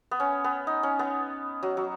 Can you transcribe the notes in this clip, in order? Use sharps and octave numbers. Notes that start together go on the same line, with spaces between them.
B3
C#4
B3
D#4
C#4
B3
F#3
F#3